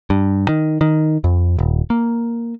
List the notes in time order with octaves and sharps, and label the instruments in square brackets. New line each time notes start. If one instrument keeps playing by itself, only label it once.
[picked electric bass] G2
D#3
D#3
F2
D#1
A#3